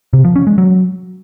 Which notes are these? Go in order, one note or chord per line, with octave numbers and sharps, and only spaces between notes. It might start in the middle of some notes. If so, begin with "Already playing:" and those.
C3
F3
C#4
G#3
F#3